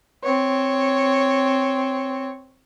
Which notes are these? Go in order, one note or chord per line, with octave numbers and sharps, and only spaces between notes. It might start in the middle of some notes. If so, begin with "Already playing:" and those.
C4 C#5